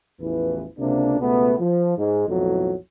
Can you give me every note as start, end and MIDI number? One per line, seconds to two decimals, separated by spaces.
0.21 0.65 33
0.21 0.65 40
0.21 0.65 52
0.21 0.65 53
0.21 0.65 71
0.79 1.15 37
0.79 1.15 48
0.79 1.15 58
0.79 1.15 62
1.20 1.54 37
1.20 1.54 47
1.20 1.54 57
1.20 1.54 59
1.60 1.93 53
1.98 2.27 44
1.98 2.27 56
2.28 2.75 35
2.28 2.75 41
2.28 2.75 45
2.28 2.75 52
2.28 2.75 54